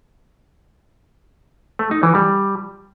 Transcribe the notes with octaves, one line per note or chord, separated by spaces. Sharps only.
A3
D#4
E3
G3